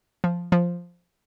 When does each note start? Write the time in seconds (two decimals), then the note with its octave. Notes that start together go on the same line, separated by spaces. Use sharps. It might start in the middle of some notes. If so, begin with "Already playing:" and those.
0.24 F3
0.52 F3